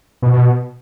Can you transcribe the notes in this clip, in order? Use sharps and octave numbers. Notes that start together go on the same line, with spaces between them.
B2
B2